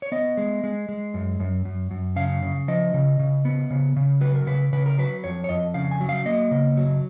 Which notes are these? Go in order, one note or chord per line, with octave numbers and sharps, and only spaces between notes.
C#5
B3 D#5
G#3
G#3
G#3
F#2
F#2
F#2
F#2
C#3 F5
C#3
F3 D#5
C#3
C#3
B3
C#3
C#3
F#3 B4
A#4
C#3 B4
C#3 B4
A#4
F#3 B4
F2 C#5
C#5
F2 D#5
C#3 F5
G#5
F#3
F5
A#3 D#5
C#3
F#3